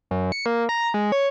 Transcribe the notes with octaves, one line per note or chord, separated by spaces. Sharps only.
F#2
C#7
A#3
A#5
G#3
C#5